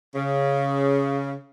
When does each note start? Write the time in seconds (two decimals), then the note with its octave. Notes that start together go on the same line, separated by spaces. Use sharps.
0.15 C#3